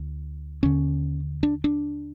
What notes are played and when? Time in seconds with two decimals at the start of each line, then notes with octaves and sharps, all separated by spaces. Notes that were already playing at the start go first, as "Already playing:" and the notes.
Already playing: D2
0.63 D#2 D3 C#4
1.43 D4
1.64 D4